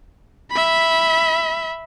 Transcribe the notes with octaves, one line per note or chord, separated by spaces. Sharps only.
E5 B5